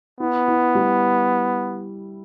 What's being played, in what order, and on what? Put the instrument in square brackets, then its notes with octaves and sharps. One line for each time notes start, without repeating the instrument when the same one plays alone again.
[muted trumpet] B3 [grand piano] E4
[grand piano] E4
G3